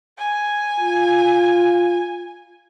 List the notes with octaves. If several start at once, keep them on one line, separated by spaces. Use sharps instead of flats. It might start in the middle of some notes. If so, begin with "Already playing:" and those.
G#5
F4